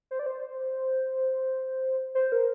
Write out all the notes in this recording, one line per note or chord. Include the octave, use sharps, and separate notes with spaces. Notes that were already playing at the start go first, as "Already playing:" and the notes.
C5
D5
C5
C5
A#4